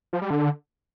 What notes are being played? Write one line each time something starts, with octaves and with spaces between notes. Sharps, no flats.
F3
G3
D3